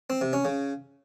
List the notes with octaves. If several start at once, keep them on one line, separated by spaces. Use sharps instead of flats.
C4
C3
C#4
C#3